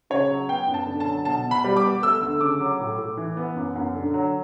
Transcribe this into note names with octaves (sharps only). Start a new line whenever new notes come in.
C#3 C#5
F#3
B3 G5
F#2
A5
D3
A5
F#3
B2 A5
B2
B5
G3
D6
B3
A3 E6
D2
C#3 D6
F#3
A2
A2
E3
B3
F#2
F#2
D3
F#3